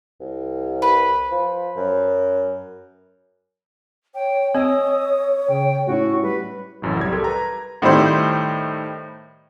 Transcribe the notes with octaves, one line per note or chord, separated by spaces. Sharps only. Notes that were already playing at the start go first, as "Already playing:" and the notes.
C2
B4
F3
F#2
C#5 G5
C4 D#5 G#5 D#6 E6
C#3 G5
A2 C#4 E4 F#4
G3 B4
A1 F#2 A2
C2 G3 G#6
G4 A4 A#4 C6
B4 A#5
A2 D#3 G3 E4 C5 C6